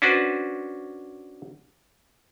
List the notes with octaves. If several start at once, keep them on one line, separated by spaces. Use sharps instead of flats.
C#4 D4 F#4 B4 C5